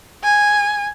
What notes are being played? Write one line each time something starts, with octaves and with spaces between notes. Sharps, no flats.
G#5